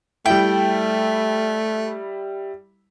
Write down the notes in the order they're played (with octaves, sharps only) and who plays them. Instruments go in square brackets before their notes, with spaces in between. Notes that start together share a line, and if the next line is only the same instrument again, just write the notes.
[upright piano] G3 E4 [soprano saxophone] A3 [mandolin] G5